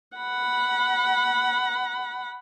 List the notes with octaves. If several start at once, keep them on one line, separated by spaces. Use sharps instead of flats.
F#5 B5